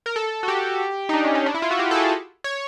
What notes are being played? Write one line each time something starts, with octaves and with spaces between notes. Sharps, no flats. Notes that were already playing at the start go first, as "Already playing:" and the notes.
A#4
A4
F#4
G4
D#4
D4
C#4
C#4
D4
E4
F4
F#4
G4
A4
G#4
C#5